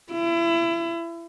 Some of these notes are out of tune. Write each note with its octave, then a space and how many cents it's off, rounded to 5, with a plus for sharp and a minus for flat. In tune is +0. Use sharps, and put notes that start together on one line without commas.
E4 +30